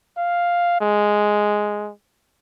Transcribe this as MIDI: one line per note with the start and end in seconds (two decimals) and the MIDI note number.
0.18 0.80 77
0.81 1.91 56